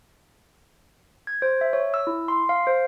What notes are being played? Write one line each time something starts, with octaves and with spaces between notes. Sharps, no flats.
G#6
C5
E5
C#5
E6
E4
C6
F5
C5